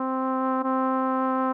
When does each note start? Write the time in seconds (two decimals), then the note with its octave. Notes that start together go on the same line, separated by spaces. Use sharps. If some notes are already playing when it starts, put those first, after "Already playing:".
Already playing: C4
0.64 C4